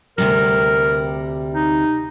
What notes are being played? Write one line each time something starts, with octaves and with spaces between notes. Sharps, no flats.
D2 C3 G3 A#4
D#4